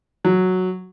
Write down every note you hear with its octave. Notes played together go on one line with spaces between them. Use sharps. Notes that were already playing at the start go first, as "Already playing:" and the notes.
F#3